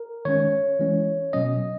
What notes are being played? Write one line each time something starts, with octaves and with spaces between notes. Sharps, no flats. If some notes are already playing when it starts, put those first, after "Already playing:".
Already playing: A#4
D#3 G#3 C#4 C#5
E3 G#3 C#4
B2 F#3 C#4 D#5